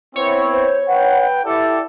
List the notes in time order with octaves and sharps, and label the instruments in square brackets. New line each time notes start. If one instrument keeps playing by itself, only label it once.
[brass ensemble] B3 C4 E4 [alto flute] C5 [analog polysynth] C#5
[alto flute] C5
[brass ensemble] B4 G5 [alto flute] F#5
[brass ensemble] E4 G4 A4 [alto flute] D5